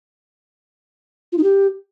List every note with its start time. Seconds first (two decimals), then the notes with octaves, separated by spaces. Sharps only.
1.32 F4
1.38 D#4
1.43 G4